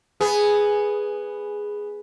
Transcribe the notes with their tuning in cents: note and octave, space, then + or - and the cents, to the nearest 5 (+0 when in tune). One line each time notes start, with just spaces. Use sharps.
B3 +0 G#4 +0